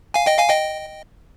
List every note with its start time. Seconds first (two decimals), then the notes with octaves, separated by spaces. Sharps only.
0.14 F5 G#5
0.26 D#5 G5
0.39 F5 G#5
0.49 D#5 G5